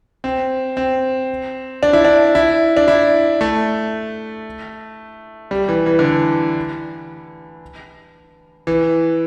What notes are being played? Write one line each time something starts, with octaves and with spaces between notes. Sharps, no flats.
C4
C4
D4
E4
D4
E4
D4
E4
A3
G3
E3
E3
D3
E3
E3